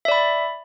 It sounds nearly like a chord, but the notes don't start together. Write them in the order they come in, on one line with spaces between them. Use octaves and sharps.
E5 D5 B5